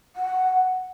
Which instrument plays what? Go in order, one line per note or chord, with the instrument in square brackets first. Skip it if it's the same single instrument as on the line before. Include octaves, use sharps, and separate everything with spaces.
[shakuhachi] F#5